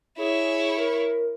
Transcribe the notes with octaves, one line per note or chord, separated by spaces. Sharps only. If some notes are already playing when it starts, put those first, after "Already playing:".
E4 G#4 C#5
A#4